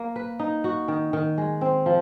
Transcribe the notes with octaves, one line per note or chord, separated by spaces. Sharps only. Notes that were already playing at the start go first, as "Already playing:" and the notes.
Already playing: A#3
B4
D#4
F#4
D#3
D#3
G#3
C4
F3